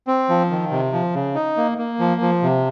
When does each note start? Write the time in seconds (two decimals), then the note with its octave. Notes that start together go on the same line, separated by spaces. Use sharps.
0.07 C4
0.29 F3
0.50 D#3
0.71 C3
0.92 F3
1.14 C#3
1.35 D#4
1.57 A#3
1.78 A#3
1.99 F3
2.21 F3
2.42 C3